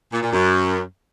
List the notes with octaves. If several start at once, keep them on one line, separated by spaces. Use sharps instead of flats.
A#2
A#2
F#2